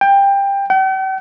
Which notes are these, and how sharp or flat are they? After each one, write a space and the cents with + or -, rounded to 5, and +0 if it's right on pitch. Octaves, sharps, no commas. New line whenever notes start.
G5 +20
G5 -45